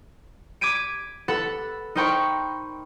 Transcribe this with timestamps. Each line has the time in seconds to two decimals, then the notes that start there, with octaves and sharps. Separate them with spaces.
0.61 D6 G#6 B6 D7 D#7
1.28 A4 B4 F#5
1.95 D#4 A#4 C5 G5 B5 C#6